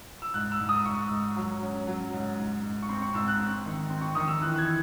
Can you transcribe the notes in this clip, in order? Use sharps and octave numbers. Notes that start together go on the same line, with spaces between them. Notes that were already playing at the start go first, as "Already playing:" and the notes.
E6
G#2 F#6
E6
G#2
D#6
G#2 C#6
G#2
F#3
C#4
F#3
G#2
G#2
G#2
C#6
C4 C6
C#6
G#2 E6
F#6
C4
D#3
C4
C#6
D#3 D#6
E6
E3 F#6
F#6
G#6
E3